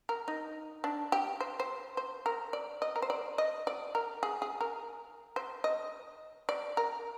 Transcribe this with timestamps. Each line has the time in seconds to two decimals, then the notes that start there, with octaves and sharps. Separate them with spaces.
0.09 A#4
0.28 D#4
0.84 D4
1.12 G4
1.41 C5
1.60 C5
1.97 C5
2.26 A#4
2.53 D5
2.82 D#5
2.96 A#4
3.02 C5
3.10 D5
3.38 D#5
3.67 D5
3.95 A#4
4.23 G#4
4.42 G#4
4.61 A#4
5.36 C5
5.64 D#5
6.49 D5
6.77 A#4